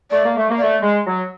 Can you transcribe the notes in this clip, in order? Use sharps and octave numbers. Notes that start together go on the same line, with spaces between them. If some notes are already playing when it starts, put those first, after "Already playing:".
A3 D5
A#3
A3
A#3
A3 D5
G#3
F#3